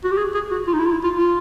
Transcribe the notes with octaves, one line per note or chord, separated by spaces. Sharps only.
F#4
G4
G#4
G#4
F#4
F4
D#4
E4
F4
E4
F4
F4